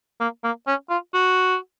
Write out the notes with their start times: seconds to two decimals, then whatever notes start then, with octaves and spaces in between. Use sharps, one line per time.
0.20 A#3
0.44 A#3
0.67 C#4
0.90 F4
1.14 F#4